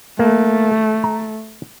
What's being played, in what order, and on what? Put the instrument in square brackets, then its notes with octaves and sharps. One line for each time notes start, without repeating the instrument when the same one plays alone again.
[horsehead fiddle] A3 [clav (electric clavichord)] A#3
[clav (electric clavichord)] A#5